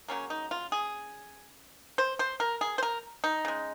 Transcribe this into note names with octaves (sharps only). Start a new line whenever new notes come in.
C#3 F#3 A#3 C#4
D#4
F4
G#4
C5
C5
A#4
G#4
C5
A#4
D#4
C#3 G#3